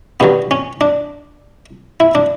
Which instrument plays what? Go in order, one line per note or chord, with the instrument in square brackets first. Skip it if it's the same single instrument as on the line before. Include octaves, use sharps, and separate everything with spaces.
[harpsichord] G2 D3 F#3 B3
C#4
D4
E4
D4